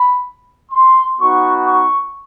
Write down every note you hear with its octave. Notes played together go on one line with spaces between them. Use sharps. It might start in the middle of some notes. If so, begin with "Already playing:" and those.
Already playing: B5
C6
B3 D#4 F#4 C#6
C#6